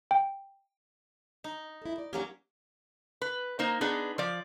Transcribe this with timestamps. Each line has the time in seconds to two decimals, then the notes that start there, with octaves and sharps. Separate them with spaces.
0.11 G5
1.44 D#4
1.82 E4 A4
1.98 D5
2.13 F#3 A#3 C#4 D4 G4
3.22 B4
3.59 A#3 D#4 C5
3.81 B3 D4 D#4 G#4 B4
4.18 F3 D5